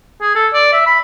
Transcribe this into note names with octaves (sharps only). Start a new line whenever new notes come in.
G#4
A4
D5
E5
B5